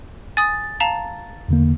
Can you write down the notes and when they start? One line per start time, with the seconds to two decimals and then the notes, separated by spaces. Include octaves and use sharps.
0.37 G#5 D#6 A6
0.80 F5 A5 A#5
1.48 E2 D3 A#3